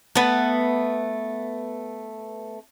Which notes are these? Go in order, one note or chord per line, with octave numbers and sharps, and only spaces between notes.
A3 B3